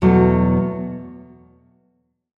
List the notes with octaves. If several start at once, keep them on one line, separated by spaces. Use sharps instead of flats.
E2 B2 F#3 A3